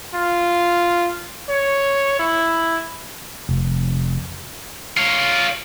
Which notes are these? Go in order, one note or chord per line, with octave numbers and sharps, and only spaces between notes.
F4
C#5
E4
F1
F4 C#5